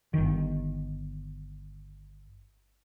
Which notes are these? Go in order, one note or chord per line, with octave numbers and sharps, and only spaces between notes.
G1 D#3